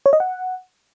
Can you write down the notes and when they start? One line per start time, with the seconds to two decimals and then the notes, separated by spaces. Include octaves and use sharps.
0.06 C#5
0.13 D#5
0.20 F#5